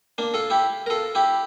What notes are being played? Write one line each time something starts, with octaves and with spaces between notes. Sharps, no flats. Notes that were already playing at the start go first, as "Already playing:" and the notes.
A#3 D4
F4 A4
E4 G4
A#4
F4 A4
E4 G4